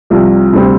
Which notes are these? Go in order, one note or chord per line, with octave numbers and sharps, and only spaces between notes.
C2 C3 F3
D2 C3 G3 C4